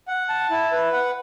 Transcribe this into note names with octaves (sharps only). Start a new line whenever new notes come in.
F#5
A5
E4
B4
F#5